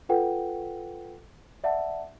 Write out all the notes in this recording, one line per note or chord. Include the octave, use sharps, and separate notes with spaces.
F4 A4 B4 F#5 G5
D5 E5 F#5 A5